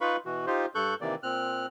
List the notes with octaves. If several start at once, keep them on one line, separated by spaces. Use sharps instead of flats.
D#4 F4 B4 F5 B5 C#6
B2 E3 F#4
D#4 F4 G4 C5
G2 A4 C#6 F#6 G6
C3 D#3 E3 A#3 D5
A#2 C4 F6 F#6